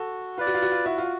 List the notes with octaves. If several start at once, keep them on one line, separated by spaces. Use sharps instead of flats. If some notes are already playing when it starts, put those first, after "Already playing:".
Already playing: F#4 A4
F4 B4 D5
F#4
F4
F#4
F4
E4 F#4
F4